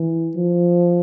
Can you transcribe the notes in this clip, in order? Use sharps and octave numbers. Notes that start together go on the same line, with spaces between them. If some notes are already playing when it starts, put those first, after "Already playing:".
Already playing: E3
F3